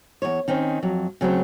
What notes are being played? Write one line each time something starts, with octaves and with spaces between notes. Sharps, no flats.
E2 C#5
D#3 C4 C#4
F2 F#3
C#3 F#3 A3 C4